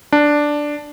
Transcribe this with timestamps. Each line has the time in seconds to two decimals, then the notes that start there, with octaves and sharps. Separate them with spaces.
0.12 D4